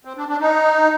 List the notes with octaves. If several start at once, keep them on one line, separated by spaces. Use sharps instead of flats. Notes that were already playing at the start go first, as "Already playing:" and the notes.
C4
D4
D4
D#4